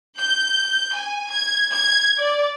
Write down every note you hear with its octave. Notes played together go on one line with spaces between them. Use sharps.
G6
G#5
G#6
G#6
D5